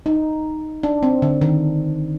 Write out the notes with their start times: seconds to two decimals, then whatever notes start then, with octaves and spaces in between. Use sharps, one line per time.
0.06 D#4
0.83 D4
1.03 C4
1.22 D3
1.41 D#3